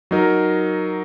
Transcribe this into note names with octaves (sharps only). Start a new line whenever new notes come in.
F#3 D#4 A#4